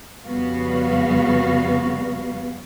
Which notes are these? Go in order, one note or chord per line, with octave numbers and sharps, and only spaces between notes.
F2 C#3 G3 B3 F#4 F5